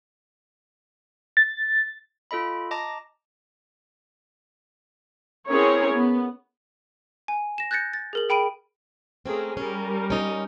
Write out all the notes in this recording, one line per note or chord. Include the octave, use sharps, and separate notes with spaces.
A6
F4 A4 D#5 B5
D#5 A5 A#5 D6 A#6
C4 C#4 E4 G#4 A#4 C#5
B3
G#5
A#6 E7
F#6 G6 A6 A#6 C#7
A6
G#4 A#4 F#7
G#4 G5 B5 D7 D#7
A3 C4 C#4 G#4 A#4
G3 C#4 A#4
C#4 D#4